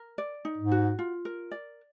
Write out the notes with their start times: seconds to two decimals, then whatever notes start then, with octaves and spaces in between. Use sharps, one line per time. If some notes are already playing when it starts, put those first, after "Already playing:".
Already playing: A#4
0.18 D5
0.45 D#4
0.58 G#2
0.72 F#4
0.99 F4
1.25 A#4
1.52 D5